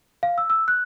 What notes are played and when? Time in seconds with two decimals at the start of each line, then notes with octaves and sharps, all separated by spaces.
0.23 F5
0.38 E6
0.50 E6
0.68 F#6